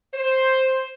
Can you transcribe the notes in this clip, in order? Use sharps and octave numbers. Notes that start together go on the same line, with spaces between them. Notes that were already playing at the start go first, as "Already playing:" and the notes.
C5